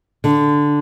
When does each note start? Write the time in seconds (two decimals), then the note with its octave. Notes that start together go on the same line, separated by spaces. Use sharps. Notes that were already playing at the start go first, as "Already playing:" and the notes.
0.24 D3